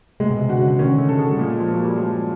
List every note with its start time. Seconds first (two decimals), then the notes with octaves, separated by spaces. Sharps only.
0.20 C3 G#3
0.30 B2
0.39 C3
0.49 D3 F#4
0.59 C#3
0.68 D3
0.79 D#3 C#4
0.98 A3
1.09 A4
1.19 G#3
1.31 G3
1.38 A#2
1.44 G#3
1.60 F3
1.68 A#3
1.74 F#3
1.85 G3
1.97 F3 G#3